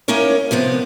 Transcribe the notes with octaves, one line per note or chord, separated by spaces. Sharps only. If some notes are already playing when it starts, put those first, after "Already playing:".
A#3 C#4 D#4 E4 A#4 C#5
C3 F3 B3 C4